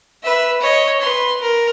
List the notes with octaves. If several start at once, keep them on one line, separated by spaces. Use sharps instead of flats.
B4 E5
C#5 D#5
B4 C6
A#4